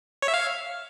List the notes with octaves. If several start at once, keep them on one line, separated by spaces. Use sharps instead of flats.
C#5
E5
F5